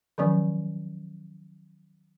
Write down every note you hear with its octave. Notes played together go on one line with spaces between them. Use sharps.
D#3 F3 F#3 C#4